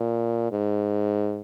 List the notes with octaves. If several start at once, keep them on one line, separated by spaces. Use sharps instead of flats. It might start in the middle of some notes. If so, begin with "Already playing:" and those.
Already playing: A#2
G#2